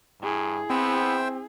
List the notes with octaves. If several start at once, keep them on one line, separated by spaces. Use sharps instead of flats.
G2 E4 G#4
B3 C4 C5 E5 G5